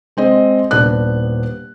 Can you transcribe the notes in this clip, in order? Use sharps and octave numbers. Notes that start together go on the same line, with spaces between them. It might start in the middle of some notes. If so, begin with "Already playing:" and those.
G#3 C4 D#5
D#1 B3 D4 F#6